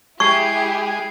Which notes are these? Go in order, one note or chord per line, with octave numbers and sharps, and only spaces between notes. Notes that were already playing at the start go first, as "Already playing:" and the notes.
G#3 E4 G4 G#4 C#6 G#6 C7